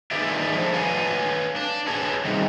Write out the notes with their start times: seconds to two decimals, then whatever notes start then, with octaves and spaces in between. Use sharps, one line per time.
0.11 D#3 D4 G#4 B4 D5 E5
0.52 F3 A3
0.74 B4 C#5 F5 G#5
1.56 D4
1.87 G#4 B4 C#5 A5
2.25 C3 D#3 G3